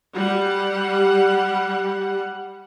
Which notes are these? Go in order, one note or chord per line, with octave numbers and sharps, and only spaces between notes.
G3 F#5